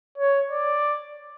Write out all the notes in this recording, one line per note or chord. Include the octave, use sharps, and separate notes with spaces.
C#5
D5